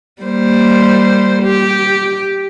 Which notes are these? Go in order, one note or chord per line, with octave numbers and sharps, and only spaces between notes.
G3 A#3 C5
G4